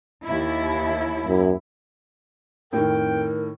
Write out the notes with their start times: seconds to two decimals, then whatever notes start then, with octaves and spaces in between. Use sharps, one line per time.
0.25 D#2 E4
1.27 F#2
2.73 F2 A2 D#3 A#4 G5